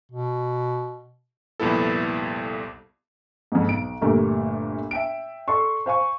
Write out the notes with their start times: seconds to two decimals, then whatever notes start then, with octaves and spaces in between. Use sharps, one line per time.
0.12 B2
1.60 C2 F2 A#2 B3 E4 A4
3.52 F2 G#2
3.68 B1 D7
4.01 G1 A#2 G3 A3 A#4
4.91 E5 G5 D7
5.48 A4 D5 C6 C#6
5.86 C5 F5 G#5 C#6